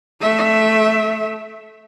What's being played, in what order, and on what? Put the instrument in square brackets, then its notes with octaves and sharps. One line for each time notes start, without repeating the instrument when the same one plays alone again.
[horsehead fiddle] A3 E5